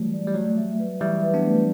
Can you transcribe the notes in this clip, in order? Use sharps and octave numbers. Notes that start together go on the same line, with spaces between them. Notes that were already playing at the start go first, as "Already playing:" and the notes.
Already playing: E3 F#3 G3 A3
D5
G3
F#3 A3
E5
B4
E3 G3 E5
B4
B3 D4
A3